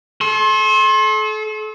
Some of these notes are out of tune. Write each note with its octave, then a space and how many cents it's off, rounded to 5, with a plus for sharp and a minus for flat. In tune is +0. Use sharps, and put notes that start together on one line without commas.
A4 -35 C6 +35